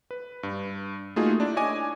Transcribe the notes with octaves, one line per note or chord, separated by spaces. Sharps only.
B4
G2
A3 A#3 D#4 F4 F#4 G#4
D4 E4 D5
C#5 D#5 G#5 D6